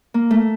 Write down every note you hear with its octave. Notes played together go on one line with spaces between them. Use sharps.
A#3
A3